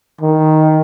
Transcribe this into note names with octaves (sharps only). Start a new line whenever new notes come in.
D#3